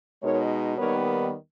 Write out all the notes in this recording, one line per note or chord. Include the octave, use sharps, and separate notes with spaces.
B2 G#3 D#4 A#4 C#5
D#2 D#3 G3 B3 A#4 C#5